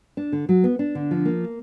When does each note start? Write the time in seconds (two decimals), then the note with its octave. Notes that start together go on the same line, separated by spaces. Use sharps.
0.17 D4
0.32 D3
0.49 F#3
0.64 B3
0.79 D4
0.95 D3
1.11 F3
1.25 A#3